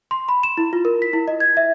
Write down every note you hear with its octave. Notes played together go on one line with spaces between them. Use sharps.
C6
B5
E7
E4
F4
A#4
B6
E4
D#5
G#6
E5